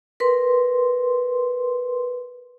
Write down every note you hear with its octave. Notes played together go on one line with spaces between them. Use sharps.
A#4 B4 C6